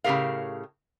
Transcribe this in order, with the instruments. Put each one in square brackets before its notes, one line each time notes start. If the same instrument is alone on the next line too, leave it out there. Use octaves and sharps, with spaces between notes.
[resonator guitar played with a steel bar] A2 C#3 D#4 G4 A#4 F5